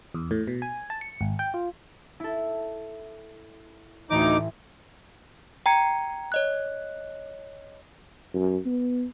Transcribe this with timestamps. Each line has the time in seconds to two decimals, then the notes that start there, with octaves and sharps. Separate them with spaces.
0.14 E2
0.31 A2
0.47 B2
0.62 G#5
0.90 A5
1.01 C#7
1.21 G#1
1.39 G5
1.54 F4
2.20 E4 A4
4.10 A1 D2 A2 E3 D#4 D6
5.66 G5 A#5 G#6 C#7
6.32 C#5 D#5 F#6
8.34 F#2
8.66 B3